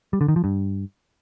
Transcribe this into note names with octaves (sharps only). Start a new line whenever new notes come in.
G3
D3
D#3
F3
G2